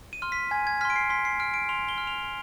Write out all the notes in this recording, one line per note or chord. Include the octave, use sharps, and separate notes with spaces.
D#7
C6 F6
B6
G#5 G#6
G#6
C6 F6 B6
D7
C7
C6 B6
C7
F6 D7
D7
C6 F7
G7
F6
F7